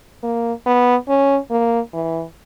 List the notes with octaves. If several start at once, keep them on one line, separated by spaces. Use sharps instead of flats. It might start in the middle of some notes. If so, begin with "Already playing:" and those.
A#3
B3
C#4
A#3
E3